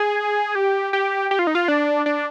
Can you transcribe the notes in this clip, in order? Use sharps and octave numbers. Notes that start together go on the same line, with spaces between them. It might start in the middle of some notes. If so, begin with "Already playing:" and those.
Already playing: G#4
G4
G4
G4
F4
D#4
F4
D4
D4